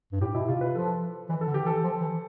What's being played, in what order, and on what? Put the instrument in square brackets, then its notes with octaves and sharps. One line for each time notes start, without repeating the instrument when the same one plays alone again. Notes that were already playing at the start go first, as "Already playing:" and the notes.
[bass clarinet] G2
[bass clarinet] A2 [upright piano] G4
[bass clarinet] B2 [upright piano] E4
[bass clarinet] C3 [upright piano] F4
[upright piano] B4
[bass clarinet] F3 [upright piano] A4
[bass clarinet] E3 [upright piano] B4
[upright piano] A4
[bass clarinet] D3
[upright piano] G4
[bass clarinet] E3 [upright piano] A4
[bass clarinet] F3
E3